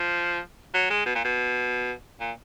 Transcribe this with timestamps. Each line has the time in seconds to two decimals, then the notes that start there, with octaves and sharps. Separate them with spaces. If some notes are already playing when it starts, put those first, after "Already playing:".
Already playing: F3
0.74 F#3
0.90 G#3
1.06 B2
1.15 A#2
1.24 B2
2.20 A#2